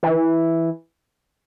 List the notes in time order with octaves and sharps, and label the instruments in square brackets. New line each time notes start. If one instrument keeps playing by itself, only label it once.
[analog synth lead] E3